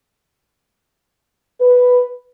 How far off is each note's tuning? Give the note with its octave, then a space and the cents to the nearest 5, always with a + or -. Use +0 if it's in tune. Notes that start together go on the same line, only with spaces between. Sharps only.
B4 +0